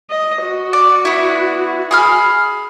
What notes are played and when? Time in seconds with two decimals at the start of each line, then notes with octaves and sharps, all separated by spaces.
0.10 D#5
0.43 F#4
0.73 D5
1.05 B3 E4
1.91 G#4 B5 F6